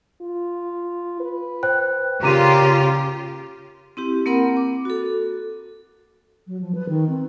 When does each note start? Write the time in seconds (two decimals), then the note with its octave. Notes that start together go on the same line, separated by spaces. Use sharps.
0.21 F4
1.20 B4
1.63 C5 G5 F#6
2.23 A#2 C#3 F4 G4 A#5 D6 D#7
3.97 C4 E4 G4
4.26 A#3 C4 A#4 F#5 B5
4.57 D6
4.85 F#4 A4
6.46 F#3
6.61 F3
6.75 B4
6.89 D#3
7.09 C4